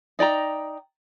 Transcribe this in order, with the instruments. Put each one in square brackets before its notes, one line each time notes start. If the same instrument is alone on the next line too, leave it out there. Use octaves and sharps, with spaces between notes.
[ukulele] D#4 D5 G5 A#5